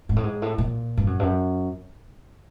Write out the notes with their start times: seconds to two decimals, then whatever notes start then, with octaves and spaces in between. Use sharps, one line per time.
0.09 G#2
0.16 A2
0.24 G#2
0.42 A2
0.58 A#2
0.97 G2
1.07 F#2
1.20 G2
1.23 F#2